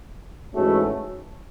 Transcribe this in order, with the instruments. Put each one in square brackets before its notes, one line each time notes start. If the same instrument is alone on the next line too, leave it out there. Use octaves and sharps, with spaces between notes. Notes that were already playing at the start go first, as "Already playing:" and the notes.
[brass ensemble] G#2 E3 A3 C#4 F#4